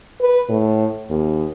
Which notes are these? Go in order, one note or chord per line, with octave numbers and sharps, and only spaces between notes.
B4
A2
D#2